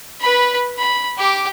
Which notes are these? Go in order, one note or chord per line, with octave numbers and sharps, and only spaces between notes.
B4 B5
B5
G4 D6